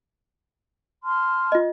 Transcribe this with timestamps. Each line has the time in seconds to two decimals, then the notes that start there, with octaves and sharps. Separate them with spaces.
1.03 A5 C6 F6
1.52 F4 D#5